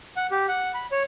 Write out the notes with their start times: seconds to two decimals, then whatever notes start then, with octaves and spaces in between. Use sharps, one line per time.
0.16 F#5
0.31 G4
0.48 F#5
0.74 B5
0.92 C#5